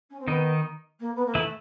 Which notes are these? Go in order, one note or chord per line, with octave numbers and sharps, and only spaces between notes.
C#4
C4
D#3 B3 D#4
A#3
B3
A#3
E3 A3 E4